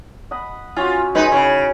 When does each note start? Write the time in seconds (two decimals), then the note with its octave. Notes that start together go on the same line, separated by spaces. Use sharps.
0.31 D#5 F#5 B5
0.76 C#4 F4 F#4
1.15 G#3 D#4 B4 G#5
1.32 C#3 E4 C6 C#6